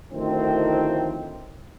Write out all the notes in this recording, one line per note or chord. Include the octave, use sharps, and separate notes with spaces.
D2 A2 D#3 F3 C4